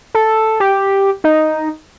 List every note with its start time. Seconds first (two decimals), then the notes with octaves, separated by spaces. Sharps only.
0.15 A4
0.60 G4
1.24 D#4